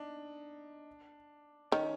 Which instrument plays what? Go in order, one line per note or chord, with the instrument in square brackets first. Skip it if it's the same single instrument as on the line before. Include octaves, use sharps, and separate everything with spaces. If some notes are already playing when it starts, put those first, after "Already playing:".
Already playing: [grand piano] D4 D#4
[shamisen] D#3 [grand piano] C#4